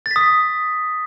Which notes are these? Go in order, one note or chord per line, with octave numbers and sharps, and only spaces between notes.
A6
B6
D#6
B6
A6